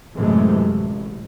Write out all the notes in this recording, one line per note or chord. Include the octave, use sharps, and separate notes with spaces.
F#2 A2 C3 E3 G#3 A3
A1